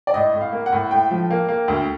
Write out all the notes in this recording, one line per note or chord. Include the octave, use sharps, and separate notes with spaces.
D5
A2 D#5
A2
F5
A#3
F#5
A2
A2 G5
F3
A#3
A#3
D2